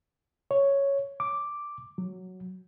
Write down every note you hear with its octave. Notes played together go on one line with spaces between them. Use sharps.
C#5
D6
F#3